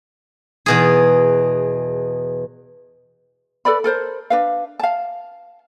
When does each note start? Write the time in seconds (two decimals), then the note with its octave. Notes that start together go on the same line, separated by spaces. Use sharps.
0.66 E2 B2 G#4
3.65 A4 B4 D5 B5
3.84 A4 A#4 C5
4.30 D4 B4 F5
4.79 F5 A5